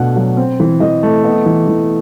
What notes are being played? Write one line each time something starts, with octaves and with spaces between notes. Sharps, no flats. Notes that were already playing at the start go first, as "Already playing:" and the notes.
Already playing: B2 A3 D4 F#5
F#3
C4
E3
E3 D#5
A3
B3 D#5
E3
E3